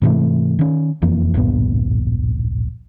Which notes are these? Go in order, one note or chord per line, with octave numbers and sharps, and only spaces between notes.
G#2 C3 E3 A3
D#3 C#4
E1 F2 E3 A#3
D1 A#1 G2 B3